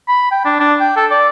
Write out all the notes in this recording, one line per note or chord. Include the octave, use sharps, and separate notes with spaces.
B5
G5
D4
D4
G5
A4
D5